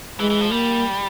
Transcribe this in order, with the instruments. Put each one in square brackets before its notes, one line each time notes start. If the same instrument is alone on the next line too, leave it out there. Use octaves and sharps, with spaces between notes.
[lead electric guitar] E3 [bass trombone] G#3
[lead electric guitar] E3
F3
[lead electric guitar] G3 [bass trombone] A#3